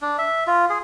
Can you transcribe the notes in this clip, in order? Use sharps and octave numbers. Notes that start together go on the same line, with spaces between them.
D4
E5
F4
G#4